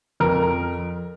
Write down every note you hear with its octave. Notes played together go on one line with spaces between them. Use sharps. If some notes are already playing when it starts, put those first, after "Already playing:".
F2 A#4